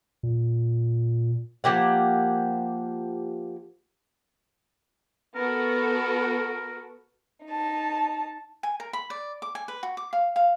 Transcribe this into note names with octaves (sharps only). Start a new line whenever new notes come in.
A#2
F3 A#3 G4 F#5
B3 F#4 A4 A#4
D#4 A5
G#5
A#4
B5
D5
D6
G#5
B4
F#4
D6
F5
F5